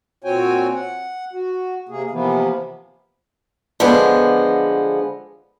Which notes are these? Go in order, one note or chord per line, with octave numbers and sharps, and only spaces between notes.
A#2 C4 F#4 C#5 G5 G#5
F#5
F#4
C3 A#3 G#4
C3 E3 F3 A#3 B3
D3 F3 G#3 B3